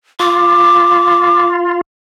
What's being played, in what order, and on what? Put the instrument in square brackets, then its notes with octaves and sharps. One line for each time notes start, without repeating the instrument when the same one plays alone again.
[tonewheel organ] F4 [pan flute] D6